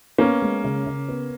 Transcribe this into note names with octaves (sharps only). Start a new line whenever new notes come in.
A#3 B3 C#4
G#3
C#3
C#3
B3